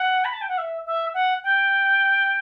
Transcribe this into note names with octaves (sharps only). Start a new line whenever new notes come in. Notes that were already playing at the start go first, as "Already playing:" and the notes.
Already playing: F#5
B5
A5
G5
F#5
E5
E5
F#5
G5